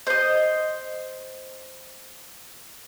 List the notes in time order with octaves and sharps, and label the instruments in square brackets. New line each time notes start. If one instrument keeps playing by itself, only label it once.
[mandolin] C5 D#5